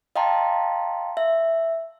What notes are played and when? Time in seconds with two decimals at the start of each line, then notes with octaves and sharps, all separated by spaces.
0.16 D#5 F5 G5 A5 A#5 C6
1.17 E5